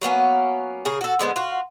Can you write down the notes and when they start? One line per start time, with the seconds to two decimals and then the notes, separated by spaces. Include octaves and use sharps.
0.02 F#3 A#3 B3 C#4
0.85 C#3 G#4 A#4
1.01 F#4 A4
1.19 D3 G#3 B3 C5
1.36 F4 F#4